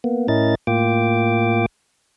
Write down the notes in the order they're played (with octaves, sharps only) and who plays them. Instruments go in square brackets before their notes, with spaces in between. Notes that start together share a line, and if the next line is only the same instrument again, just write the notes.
[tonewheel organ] A#3 B3
A2 C#4 E4 A#4 D#5 A6
A2 A#3 F4 G5 D6